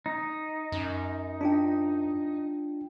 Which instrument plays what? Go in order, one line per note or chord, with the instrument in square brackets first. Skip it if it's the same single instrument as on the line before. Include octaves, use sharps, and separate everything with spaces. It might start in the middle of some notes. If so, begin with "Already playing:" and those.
[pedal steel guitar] D#4
[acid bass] F#2
[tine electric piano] D4 F4 G5